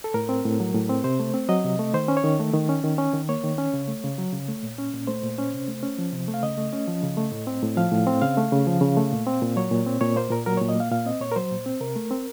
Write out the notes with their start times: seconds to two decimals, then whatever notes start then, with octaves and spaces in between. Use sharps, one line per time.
0.04 A4
0.14 A2 A#4
0.29 C4
0.45 A2
0.60 F#3
0.74 A2
0.89 C4
1.04 C3 C5
1.19 A3
1.34 C4
1.49 F#3 D#5
1.64 C3
1.79 A3
1.94 D#3 C5
2.08 C#4
2.17 C#5
2.24 D#3
2.39 A3
2.54 D#3
2.69 C#4
2.84 D#3
2.98 C#4
3.13 D#3
3.29 A#3 C#5
3.44 D#3
3.58 C#4
3.74 C#3
3.88 A3
4.04 C#3
4.18 F#3
4.33 C#3
4.49 A3
4.63 A#2
4.78 C#4
4.94 A#2
5.07 A3 C5
5.23 A#2
5.38 C#4
5.53 C3
5.68 A3
5.83 C#4
5.98 F3
6.13 C3
6.28 A3
6.34 F5
6.43 C#3 D#5
6.57 A3
6.73 C#4
6.88 F3
7.03 C#3
7.17 A3
7.32 A2
7.47 C4
7.62 A2
7.77 F3 F5
7.92 A2
8.07 C4
8.22 C#3 F5
8.37 A3
8.52 C#3
8.67 F3
8.81 C#3
8.97 A3
9.12 A#2
9.27 C4
9.42 A#2
9.56 F#3 C#5
9.71 A#2
9.87 C4
10.01 A#2 C#5
10.16 A#3 C5
10.31 A#2 A#4
10.46 F#3 A#4
10.57 A#2 C#5
10.69 D#5
10.76 A#3 F5
10.92 A#2 F5
11.06 C4 D#5
11.21 A#2 C#5
11.32 A#4
11.36 F#3 C5
11.51 A#2
11.66 C4
11.81 C3 A#4
11.96 A3
12.10 C4